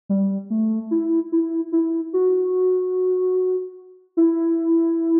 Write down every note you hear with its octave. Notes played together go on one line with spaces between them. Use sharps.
G3
A3
E4
E4
E4
F#4
E4